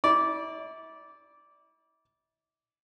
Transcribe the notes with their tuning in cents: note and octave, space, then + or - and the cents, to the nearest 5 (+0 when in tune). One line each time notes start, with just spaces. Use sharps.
E4 -40 D5 -10